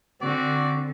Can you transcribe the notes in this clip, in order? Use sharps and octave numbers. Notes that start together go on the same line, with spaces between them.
D3 C4 F#4 D5